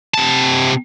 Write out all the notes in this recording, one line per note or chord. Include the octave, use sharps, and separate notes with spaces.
C3 A5